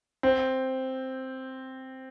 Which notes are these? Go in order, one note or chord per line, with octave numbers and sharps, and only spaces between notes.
C4